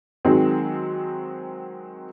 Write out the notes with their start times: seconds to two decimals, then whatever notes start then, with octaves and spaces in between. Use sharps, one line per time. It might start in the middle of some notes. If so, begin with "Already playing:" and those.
0.25 D#3 F#3 G#3 C4